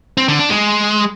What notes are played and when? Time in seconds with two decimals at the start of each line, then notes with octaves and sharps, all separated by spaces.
0.17 C4
0.28 D3
0.39 D4
0.50 G#3